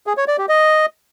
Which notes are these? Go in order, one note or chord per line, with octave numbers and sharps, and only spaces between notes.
G#4
C#5
D5
G4
D#5